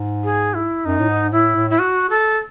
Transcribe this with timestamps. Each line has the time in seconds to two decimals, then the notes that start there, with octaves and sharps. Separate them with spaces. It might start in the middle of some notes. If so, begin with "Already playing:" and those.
Already playing: G#2
0.24 G#4
0.54 E4
0.85 F#2 D#4
1.00 A2
1.09 G#2
1.32 A2 E4
1.56 A2
1.70 E4
1.79 F#4
2.10 A4